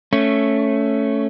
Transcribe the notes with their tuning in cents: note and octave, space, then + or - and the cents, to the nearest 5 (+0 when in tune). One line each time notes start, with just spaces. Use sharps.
A3 +0 C#4 +0